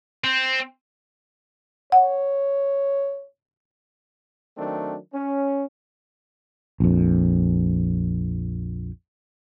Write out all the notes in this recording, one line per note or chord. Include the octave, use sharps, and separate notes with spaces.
C4
C#5 F#5
D#3 F#3 A3 C4 D4
C#4
A#1 F2